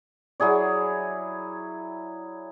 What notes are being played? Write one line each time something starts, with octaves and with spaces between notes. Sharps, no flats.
F#3 E4 G#4 D5